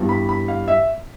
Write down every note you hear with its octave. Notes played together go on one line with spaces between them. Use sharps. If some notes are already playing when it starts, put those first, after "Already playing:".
Already playing: G2 E3 G3 B3
B5
B5
F5
E5